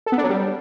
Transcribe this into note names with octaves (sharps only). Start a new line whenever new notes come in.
A4
B3
D4
F#3
G3